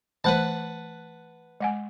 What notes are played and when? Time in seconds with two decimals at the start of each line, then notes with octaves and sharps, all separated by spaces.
0.24 E3 A3 B4 C5 F#5 A5
1.60 G#3 F#5 G#5